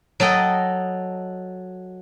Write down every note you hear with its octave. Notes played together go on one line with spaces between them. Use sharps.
F#3 A4 D#5 G5